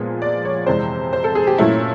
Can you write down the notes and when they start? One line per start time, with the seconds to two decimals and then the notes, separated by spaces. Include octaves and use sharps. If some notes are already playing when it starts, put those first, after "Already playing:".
Already playing: A#2 F3 G#3 B3
0.22 D5
0.45 C#5
0.67 F2 C3 E3 G#3 C5
1.13 C5
1.24 A4
1.35 G#4
1.47 G4
1.58 A#2 F#3 A3 C#4 E4